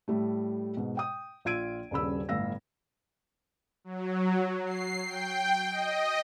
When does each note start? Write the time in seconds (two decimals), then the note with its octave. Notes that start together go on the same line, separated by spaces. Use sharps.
0.08 A2 G3 A3
0.77 G#2 B2
0.97 G5 D#6
1.45 A#1 F4 E6 G#6 D7 D#7
1.91 D#1 G2 C#3 B5 E6
2.29 G1 A2 F5 E6 A#6
3.84 F#3
4.65 C7
5.06 G5
5.71 D#5